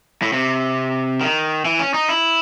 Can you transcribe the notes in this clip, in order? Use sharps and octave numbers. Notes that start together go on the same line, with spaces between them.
A2
C3
D#3
E3
C#4
D#4
E4